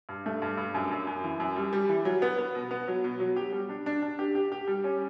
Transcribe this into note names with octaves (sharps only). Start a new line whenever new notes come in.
G2
A3
G2
G2
F#2
F#2
F#2
E3
F#2
G3
G3
E3
F#3
B3
B3
B2
B3
F#3
B2
F#3
G4
G3
D4
D4
D4
G4
G4
G4
G3
C#4